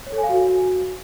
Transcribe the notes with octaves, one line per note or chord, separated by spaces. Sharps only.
C#5
A4
G#5
F5
F#4